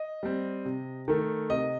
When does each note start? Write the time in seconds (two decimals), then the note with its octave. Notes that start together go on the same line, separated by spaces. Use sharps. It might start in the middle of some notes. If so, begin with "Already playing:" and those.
Already playing: D#5
0.23 G3 C4
0.65 C3
1.08 D#3 A3
1.50 C3 D#5